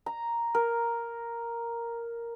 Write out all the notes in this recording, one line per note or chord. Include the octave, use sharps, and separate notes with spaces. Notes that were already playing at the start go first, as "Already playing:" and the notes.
A#5
A#4